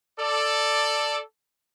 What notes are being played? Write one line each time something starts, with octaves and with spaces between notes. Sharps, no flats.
A4 D5